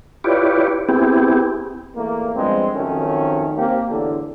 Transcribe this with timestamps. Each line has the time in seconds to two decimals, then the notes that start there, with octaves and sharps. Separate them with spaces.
0.24 E4 F4 G4 B4 C#5 D5
0.89 B3 C4 E4 G4 G#4
1.96 E2 A3 A#3
2.36 G2 F3 G#3 B3 C4
2.75 F2 D#3 F#3 A3 C#4
3.57 A#3 C4 G4
3.90 E2 A2 D3